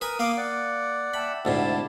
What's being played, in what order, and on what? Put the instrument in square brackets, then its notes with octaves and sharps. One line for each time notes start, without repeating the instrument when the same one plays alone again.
[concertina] A#4 D#6 [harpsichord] B4 G#5
[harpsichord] A#3 F5 [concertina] D6 D#6
[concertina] D5 F#5
[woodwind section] E5 G5 A5 [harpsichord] B5
[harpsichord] D2 G#2 C3 [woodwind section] E4 D5 A5